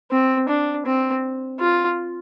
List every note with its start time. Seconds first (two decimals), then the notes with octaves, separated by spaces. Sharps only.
0.11 C4
0.49 D4
0.86 C4
1.60 F4